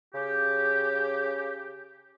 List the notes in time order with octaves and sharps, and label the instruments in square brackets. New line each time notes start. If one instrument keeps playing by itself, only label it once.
[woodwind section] C#3 G4